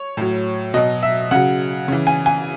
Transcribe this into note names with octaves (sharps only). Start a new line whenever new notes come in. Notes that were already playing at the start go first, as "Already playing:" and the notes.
Already playing: C#5
A2 F#3
B2 F#3 D#5
E5
C#3 F#3 F#5
C#3 E3
G#5
G#5